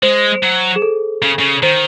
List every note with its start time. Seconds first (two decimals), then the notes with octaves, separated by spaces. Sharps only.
0.03 G#3 C5
0.43 F#3
0.76 G#4
0.82 A4
1.22 C#3
1.39 C#3
1.63 D#3 C5